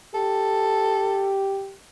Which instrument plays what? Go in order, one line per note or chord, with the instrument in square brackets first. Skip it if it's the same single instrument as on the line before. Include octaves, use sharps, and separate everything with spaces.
[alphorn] G4 [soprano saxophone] A4